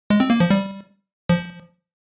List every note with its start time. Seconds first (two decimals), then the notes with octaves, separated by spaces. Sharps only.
0.10 G#3
0.20 C4
0.30 A#3
0.40 F3
0.50 G3
1.29 F3